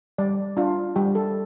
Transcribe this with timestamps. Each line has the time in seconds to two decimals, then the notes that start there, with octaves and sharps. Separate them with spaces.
0.18 G3 D5
0.57 D4 F4
0.96 G3 G4
1.15 A4